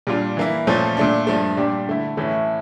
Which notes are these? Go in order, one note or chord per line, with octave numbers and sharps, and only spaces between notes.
A#2 G3 D4 F4
E3 A#3 E4
A#2 F3 A3 C#4
A#2 A3 D4
G2 F3 A3
A#2 G3 D4 G4
D3 A3 E4
A2 E3 A3 C#4 E4